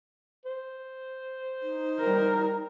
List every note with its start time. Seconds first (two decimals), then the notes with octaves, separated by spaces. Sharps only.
0.45 C5
1.62 D#4
2.00 G3 A#4